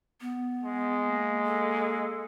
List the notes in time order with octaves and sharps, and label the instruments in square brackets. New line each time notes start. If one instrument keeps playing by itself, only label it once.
[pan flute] B3
[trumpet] G#3
[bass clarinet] A#3
[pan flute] A4